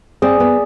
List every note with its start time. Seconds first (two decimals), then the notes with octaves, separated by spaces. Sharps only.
0.22 C4 G#4 D5 G#5
0.40 B3